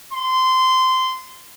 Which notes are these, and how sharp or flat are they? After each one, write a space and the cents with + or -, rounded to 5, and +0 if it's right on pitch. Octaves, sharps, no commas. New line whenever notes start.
C6 -15